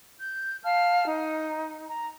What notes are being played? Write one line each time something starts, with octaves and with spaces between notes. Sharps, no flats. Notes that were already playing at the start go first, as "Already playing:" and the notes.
G6
F5 A5 F6
D#4
A#5